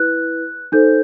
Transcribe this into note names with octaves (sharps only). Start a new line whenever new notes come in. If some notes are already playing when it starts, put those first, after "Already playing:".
Already playing: E4 B4 F#6
D#4 A4 C5 G6